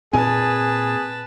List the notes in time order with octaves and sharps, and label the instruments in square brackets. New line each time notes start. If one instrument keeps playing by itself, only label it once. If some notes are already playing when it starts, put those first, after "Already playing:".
[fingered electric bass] A#2 C4 [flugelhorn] G#4 [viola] B4 A5 [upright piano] G#5